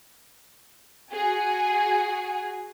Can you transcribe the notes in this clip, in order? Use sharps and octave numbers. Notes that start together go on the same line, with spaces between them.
F#4 G#4 G#5